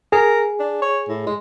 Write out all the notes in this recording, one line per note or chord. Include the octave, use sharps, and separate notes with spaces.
G#4 A#4
D4
C#5
A2
G#3